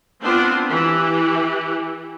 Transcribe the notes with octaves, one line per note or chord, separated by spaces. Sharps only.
B3 C4 D4 F4 C5
E3 G4